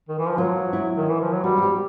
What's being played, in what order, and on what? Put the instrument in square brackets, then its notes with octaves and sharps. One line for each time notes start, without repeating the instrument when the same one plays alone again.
[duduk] D#3
E3
F3
[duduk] F#3 [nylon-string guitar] F4
[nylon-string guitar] E4
[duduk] D#3
E3
F3
F#3
[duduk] G3 [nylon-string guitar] F#4
[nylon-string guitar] F#4
G4